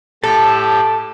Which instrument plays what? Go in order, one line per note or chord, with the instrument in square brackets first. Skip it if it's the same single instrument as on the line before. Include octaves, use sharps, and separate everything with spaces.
[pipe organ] A2 G4 [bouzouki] A4 [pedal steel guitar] A5